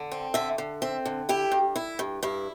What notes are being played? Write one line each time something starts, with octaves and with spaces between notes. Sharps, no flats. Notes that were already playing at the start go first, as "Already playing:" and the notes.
Already playing: D3
C4
D3 E5
D3
C4 E5
D3
E4 G4
G2
E4
G2
G2 E4